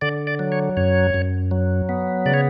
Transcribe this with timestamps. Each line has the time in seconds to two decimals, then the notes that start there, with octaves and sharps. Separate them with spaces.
0.01 D3 D5
0.27 D5
0.39 F#3
0.52 C#5
0.77 F#2 C#5
1.14 F#2
1.51 F#3
1.89 B3
2.26 C#3 D5
2.34 C#5